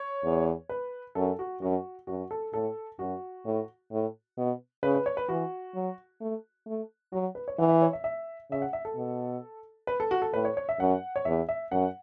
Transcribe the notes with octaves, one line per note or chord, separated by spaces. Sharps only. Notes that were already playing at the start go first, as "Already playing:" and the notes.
Already playing: C#5
E2
B4
F#2 A4
F#4
F#2 F#4
F#2 F#4
A4
A2 A4
F#2 F#4
A2
A2
B2
C#3 B4
B4
C#5
B4
E3 F#4
F#3
A3
A3
F#3 F#4
B4
C#5
E3 F#5
E5
C#5
E5
E5
C#3 E5
F#5
E5
A4
B2
B4
A4
F#4
A4
A2 B4
C#5
C#5
E5
F#2 F#5
C#5
E2 E5
E5
F#2 F#5